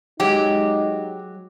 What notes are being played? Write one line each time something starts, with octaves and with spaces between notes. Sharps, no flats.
F#3 G#3 D#4 G4